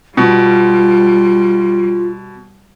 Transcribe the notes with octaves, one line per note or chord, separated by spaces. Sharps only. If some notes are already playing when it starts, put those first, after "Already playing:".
B2 G3 F4